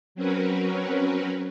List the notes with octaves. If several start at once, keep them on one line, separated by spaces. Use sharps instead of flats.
F#3 C4 C#4 F#4 A#4 B4